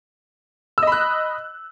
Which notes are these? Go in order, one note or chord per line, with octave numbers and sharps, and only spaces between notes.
D#5 B5 E6 F#6